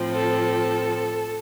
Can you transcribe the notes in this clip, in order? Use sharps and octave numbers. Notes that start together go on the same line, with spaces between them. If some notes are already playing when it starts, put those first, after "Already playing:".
Already playing: A2 F3 C4
A4